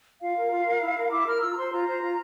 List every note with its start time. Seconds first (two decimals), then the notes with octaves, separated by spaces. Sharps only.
0.21 F4 F5
0.36 A#4
0.51 F4
0.66 A#4
0.81 E4
0.96 A#4
1.12 E4 D6
1.26 A#4 F6
1.41 F4 E6
1.52 A#5
1.57 C5 C6
1.72 F4 A#5
1.86 C5
2.02 F4